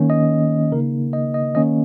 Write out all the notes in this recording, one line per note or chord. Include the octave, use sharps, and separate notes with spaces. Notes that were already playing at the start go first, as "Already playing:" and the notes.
Already playing: D#3 A#3 C#4
D#5
C#3 A#3 D#4 A#4
D#5
D#5
D#3 A#3 C#4 D#5